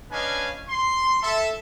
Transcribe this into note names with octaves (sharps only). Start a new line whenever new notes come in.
C#4 D4 B4 D#5 F5 G#5
C6
A4 E5